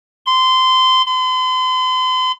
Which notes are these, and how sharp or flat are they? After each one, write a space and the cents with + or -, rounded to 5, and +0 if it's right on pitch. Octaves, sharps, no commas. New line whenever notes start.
C6 -20
C6 -40